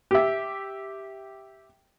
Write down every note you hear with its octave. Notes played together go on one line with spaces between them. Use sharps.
G4 E5